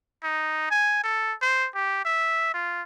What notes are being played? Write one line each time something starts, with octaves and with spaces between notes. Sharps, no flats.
D#4
G#5
A4
C5
G4
E5
F4